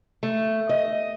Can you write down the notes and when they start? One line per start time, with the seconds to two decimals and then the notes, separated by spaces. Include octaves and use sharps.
0.23 A3
0.69 D#5